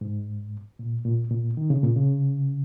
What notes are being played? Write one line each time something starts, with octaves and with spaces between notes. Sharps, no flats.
G#2
A#2
A#2
A#2
D#3
C#3
A#2
C#3